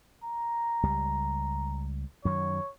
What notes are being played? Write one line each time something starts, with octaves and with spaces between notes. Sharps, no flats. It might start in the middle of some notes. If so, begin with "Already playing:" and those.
A#5
C#2 G3
F#2 D#3 F#3 C#5